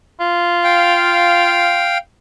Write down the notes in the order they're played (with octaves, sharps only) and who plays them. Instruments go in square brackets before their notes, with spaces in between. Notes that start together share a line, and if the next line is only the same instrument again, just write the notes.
[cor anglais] F4
[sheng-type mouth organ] F5 G5